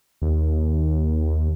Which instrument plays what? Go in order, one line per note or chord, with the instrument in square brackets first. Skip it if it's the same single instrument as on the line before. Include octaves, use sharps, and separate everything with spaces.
[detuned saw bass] D#2